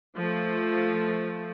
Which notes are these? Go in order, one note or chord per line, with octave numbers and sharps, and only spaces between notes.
F3 A3